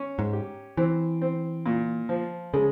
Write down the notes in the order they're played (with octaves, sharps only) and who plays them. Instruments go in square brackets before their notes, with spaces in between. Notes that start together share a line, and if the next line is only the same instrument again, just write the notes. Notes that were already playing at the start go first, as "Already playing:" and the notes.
Already playing: [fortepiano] C#4
[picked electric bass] G#2
[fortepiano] G4
[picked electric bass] E3 [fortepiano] C4
[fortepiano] C4
A#2
F3
[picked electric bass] C#3 [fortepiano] G#3